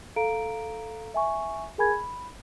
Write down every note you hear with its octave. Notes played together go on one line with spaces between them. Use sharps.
A4 F5 A#5 D7
E5 G#5 C#6
G#4 A#4 G#5 B5 G#6
B5